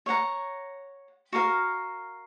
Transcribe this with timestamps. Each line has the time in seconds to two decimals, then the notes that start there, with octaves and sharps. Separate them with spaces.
0.06 C#5 F#5 A#5
1.33 F#4 A#4 F5